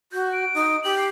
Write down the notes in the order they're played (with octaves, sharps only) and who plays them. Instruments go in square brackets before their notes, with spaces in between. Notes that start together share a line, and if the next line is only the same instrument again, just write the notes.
[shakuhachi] F#4 [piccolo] G6
[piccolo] D7
[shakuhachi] D#4
[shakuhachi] G4 [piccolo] F#7
[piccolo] C7